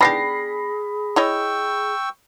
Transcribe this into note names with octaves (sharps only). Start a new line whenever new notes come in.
B3 D4 G4 G#4 B5 A#6 C7
E4 C#5 D#5 G5 C#6 E6